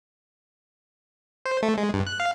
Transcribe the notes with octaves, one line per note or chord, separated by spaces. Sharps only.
C5
A3
G#3
G2
F#6
F5